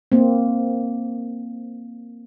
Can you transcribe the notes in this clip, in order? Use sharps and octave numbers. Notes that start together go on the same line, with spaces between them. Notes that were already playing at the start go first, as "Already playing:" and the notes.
A#3 C4